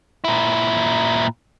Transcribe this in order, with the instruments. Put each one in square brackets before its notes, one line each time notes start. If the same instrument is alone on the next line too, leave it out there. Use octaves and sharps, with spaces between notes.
[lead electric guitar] A#2 E4